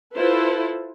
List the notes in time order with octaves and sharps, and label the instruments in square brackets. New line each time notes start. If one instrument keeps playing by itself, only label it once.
[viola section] E4 F4 A4 B4 C5